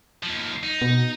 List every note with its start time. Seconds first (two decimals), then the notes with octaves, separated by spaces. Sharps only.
0.23 D#2 F3
0.63 D#4
0.82 B2